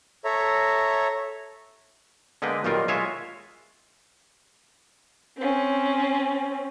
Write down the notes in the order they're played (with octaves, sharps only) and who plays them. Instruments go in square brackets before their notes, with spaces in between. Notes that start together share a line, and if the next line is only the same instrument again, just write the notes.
[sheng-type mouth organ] A4 C#5 E5 A#5
[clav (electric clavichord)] D3 G#3 A#3 B3 B4 G5
B1 A#2 D#3 G3 F4 A#4
G#3 F4 C#5 E5 F5 G#5
[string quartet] C4 C#4